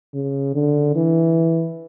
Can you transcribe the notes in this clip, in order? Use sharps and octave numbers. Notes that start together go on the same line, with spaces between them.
C#3
D3
E3